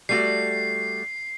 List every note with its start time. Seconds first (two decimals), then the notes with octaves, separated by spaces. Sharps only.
0.09 G3 A3 F#4 C7